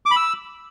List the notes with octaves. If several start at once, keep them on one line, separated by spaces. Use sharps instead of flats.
D6
B5
E6